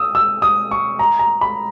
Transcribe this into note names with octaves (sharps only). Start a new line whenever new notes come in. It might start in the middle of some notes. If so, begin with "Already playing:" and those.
Already playing: D#6 E6
E6
D#6
C#6
A#5
A#5
B5